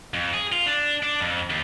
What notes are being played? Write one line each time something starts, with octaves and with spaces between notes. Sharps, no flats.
F2
G#4
F4
D4
D4
F2
D#2